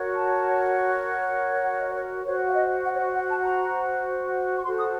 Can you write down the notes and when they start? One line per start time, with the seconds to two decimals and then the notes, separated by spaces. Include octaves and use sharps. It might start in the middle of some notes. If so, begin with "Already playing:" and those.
Already playing: F#4 A#4 C#5
0.15 A5
1.64 F#5
1.80 D#5
1.95 C#5
2.24 F#4 C5 C#5
2.49 F5
2.54 D#5
2.84 F#5
2.93 C#5
3.00 D#5
3.14 F#5
3.29 A5
3.44 A#5
4.57 C#6
4.64 F#4 A4 C5 C6
4.78 D#6